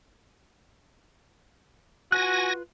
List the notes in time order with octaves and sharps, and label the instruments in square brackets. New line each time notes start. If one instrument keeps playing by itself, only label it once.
[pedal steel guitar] F4 B4 F#6 [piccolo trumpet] F#4 [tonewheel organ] G#5 A#6